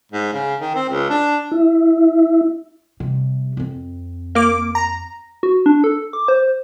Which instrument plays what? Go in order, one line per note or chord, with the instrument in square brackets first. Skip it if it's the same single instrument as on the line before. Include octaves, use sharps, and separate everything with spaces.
[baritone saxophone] G#2
C#3
D#3
C4
C#2
D4
[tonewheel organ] E4
[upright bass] C3 G3
F2 C4
[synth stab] A#3 D6
A#5
[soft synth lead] F#4
D4
A4
D6
C5